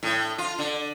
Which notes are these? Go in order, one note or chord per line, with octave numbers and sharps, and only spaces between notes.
A2
F4
D3